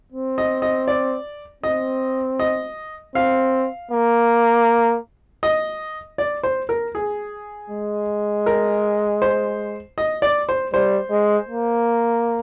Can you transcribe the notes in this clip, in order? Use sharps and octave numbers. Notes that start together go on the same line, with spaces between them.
C4
D#5
D#5
D5
C4 D#5
D#5
C4 F5
A#3
D#5
D5
C5
A#4
G#4
G#3
A#4
C5
D#5
D5
C5
G3 C5
G#3
A#3